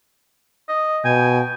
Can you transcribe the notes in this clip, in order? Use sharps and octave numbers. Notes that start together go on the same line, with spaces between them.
D#5
B2 G5 G#5